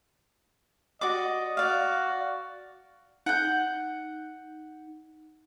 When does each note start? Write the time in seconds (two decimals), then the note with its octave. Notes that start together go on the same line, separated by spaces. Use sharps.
1.01 F#4 D5 D#5 D6
1.57 F#4 D5 F5
3.26 D#4 F#5 G6